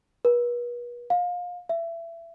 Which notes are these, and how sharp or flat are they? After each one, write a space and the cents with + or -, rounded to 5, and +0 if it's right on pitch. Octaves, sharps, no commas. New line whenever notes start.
B4 -40
F5 +30
E5 +25